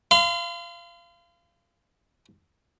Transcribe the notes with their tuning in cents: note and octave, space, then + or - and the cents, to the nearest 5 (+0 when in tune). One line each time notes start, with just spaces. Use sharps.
F5 -25 C6 -45